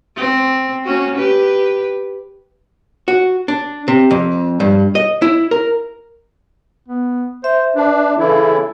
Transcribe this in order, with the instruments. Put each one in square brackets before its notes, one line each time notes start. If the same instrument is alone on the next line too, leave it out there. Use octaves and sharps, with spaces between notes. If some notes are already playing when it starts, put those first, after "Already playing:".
[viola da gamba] C4
A#3 C#4 F#4
G4 B4
[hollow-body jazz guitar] F#4
D4
C3
F2
G2
D#5
E4
A#4
[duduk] B3
[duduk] C5 [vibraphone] E5
[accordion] D4 [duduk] B4
[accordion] C#3 E3 E4 [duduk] A4